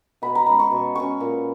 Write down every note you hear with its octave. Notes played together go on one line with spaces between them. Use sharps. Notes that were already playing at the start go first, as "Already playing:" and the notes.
B2 B5
A#5
G#3 C#4 B5
C#6
B2
G#3 C#4 C#6
A#2